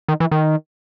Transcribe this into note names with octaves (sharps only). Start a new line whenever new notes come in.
D#3
E3
D#3